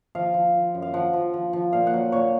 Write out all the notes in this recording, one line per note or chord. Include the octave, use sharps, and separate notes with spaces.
F3 F5
F3
F3
F#2
F5
F3 F#5
F3
F3
F3
A#2 F5
F#5
F#3
A#2 C#5